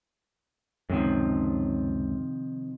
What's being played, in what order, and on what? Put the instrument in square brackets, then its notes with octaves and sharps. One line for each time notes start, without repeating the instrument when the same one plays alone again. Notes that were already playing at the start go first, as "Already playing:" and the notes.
[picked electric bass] C#2 F#2 [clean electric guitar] C3 D#3 F3